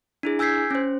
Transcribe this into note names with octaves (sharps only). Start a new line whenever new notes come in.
D4 E4 G#4
G#5 E6 G6 G#6 B6 C7
C#4 C5